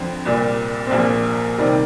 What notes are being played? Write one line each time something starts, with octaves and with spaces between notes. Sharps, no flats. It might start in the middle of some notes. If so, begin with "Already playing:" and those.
Already playing: F2 D3 F3 C4
C2 A#2 G3
C4
A#1 A#2 F3 A#3
C3 D#3 G3